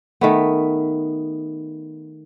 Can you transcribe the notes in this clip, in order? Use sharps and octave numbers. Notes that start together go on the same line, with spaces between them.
D#3 A3 B3